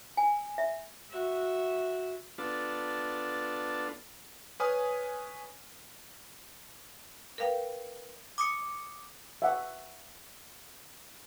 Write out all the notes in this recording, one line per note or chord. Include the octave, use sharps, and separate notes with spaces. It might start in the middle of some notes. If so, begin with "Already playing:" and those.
G#5
E5
F#4 E5
B3 D4 F4 A4
B4 C#5 G#5 D#6 F6
A#4 B4 F5 G5
D6 D#6 C#7
E5 F#5